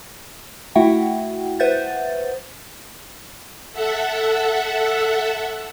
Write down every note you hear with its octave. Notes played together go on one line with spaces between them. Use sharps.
A3 E4 F#4 E5 F#5 G5
B4 C5 E5 F#5 G6 A6
A4 E5 F#5